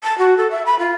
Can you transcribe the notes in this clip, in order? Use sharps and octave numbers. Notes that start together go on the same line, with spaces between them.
A5
F#4
A4
E5
B5
F4